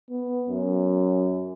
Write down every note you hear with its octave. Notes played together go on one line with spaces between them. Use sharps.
B3
F#2